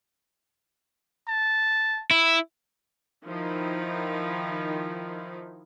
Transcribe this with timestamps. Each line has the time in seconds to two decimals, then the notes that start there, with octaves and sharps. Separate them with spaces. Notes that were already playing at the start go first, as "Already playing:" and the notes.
1.28 A5
2.11 E4
3.25 D#3 F3 D#4 E4